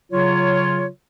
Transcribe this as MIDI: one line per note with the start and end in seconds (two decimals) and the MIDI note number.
0.12 0.87 49
0.12 0.87 54
0.12 0.87 65
0.12 0.87 73